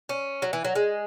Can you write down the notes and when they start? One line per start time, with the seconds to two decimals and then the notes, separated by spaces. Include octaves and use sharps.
0.09 C#4
0.42 F#3
0.53 E3
0.65 F#3
0.75 G#3